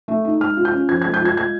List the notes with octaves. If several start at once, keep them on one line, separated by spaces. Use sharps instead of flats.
A3
D#4
G#3 F6
F4
G6
C#4
F3 G#6
G#6
G#3
G6
F4 G#6
G#3 G#6